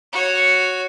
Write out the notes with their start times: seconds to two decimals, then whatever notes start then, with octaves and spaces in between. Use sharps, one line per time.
0.13 F#4 C#5